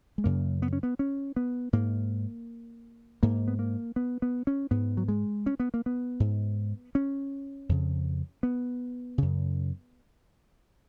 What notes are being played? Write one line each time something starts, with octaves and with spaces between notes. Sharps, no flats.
G#3
F#2 C#3 A#3
B3
C#4
B3
C#4
B3
G#2 A#3
G#2 A#3
B3
A#3
B3
B3
C#4
G#2 B3
F#3
G#3
C#4
B3
A#3
B3
G#2
C#4
F2 C#3
B3
F#2 C#3